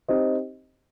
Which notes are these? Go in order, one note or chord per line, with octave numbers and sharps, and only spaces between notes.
C4 D#4 G4 C5 D#5